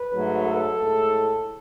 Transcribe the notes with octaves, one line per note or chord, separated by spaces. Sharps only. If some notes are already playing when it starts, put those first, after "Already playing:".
Already playing: B4
G#2 F#3 A3
A4
A2 G#3